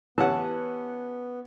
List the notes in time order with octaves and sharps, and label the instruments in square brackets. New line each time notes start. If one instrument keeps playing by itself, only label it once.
[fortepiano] E3 C#4 F#5 [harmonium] B3 [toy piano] E4 G4 [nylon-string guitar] A5